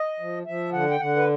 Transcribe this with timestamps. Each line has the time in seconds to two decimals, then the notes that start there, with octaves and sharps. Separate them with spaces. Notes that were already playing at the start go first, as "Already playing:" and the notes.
Already playing: D#5
0.20 F3
0.46 F3 E5
0.73 D3 F#5
0.91 G5
1.00 D3 F#5
1.16 B4